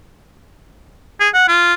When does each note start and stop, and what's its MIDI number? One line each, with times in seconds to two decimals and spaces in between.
1.20 1.29 68
1.34 1.48 78
1.48 1.74 65